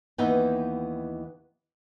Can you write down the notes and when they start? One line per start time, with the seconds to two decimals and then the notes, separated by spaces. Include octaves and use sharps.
0.18 D#2 E3 B3 D#4 B4 G5